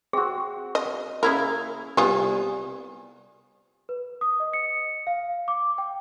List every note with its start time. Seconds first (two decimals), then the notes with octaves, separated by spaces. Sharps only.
0.13 C4 F#4 G#4
0.75 D#5
1.23 C#3 A#3 E4 A#4
1.97 C2 B3 F4 G4 G#4
3.89 B4
4.21 D#6
4.40 D#5
4.53 C#7
5.07 F5
5.48 D6
5.78 G5